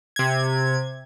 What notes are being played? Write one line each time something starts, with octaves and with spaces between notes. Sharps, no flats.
C3 G#6